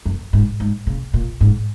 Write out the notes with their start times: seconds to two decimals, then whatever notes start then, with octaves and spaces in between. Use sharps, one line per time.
0.06 F#2
0.33 G#2
0.60 G#2
0.87 C#3
1.14 A#2
1.41 G#2